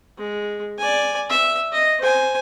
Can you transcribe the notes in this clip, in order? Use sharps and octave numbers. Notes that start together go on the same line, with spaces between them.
G#3
D5 G#5
E5
D#5
C5 G#5